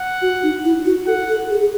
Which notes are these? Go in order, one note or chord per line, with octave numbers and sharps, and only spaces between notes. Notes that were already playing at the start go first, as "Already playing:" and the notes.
Already playing: F#5
F#4
D#4
E4
F#4
A4 F#5
A4
G#4
G#4